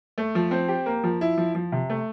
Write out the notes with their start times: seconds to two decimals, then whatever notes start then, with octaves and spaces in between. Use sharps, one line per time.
0.18 A3
0.35 F3
0.51 C4
0.68 G4
0.86 A#3
1.03 F3
1.21 E4
1.37 F3
1.55 F3
1.72 C3
1.90 A3